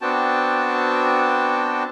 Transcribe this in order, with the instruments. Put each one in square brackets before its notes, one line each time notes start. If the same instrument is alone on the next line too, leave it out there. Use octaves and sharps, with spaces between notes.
[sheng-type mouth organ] B3 C4 D4 F#4 G5 A5